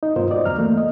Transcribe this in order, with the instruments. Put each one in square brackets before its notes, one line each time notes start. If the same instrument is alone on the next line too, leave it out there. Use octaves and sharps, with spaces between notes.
[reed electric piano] D#4 D#5
G2 B2 B3 F4 A#4 C5
B3 F#4 D5 D#5
C#2 F#2 A#5 F6
E3 A3 A#3
D#5